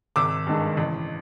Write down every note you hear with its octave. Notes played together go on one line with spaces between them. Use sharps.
G#1 D6 E6
G2 D#3 G#3
A1